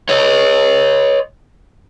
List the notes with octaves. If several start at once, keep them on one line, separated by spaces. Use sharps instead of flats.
C#5 D#5